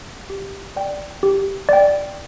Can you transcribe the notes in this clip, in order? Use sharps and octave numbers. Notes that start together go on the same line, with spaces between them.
G4
D5 G5
G4
D5 G5